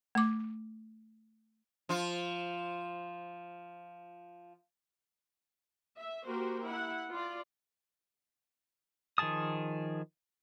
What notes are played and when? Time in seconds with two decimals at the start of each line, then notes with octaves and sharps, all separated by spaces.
0.15 A3 D6
1.89 F3 F4
5.97 E5
6.25 A#3 F#4 G4 A#4 C5
6.64 E4 F#5
7.11 F4 D5
9.18 D#3 F3 G#4 A5 D#6